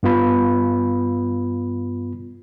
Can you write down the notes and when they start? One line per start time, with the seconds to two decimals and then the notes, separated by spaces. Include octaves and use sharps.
0.03 G2 B3 F4 B5